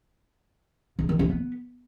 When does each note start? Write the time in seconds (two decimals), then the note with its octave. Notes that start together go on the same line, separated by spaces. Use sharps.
0.99 C#3
1.09 D#3
1.19 C#4
1.30 B3